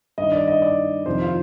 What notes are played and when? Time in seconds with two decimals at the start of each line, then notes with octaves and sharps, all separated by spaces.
0.18 G2 D#3 D#5
0.32 D5
0.47 D#5
0.62 D5
1.06 F2 C3 D#3 C5
1.21 F4